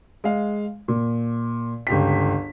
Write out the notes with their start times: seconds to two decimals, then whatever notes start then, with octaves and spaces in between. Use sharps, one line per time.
0.24 G#3 F5
0.88 A#2
1.87 G1 C#2 G4 B6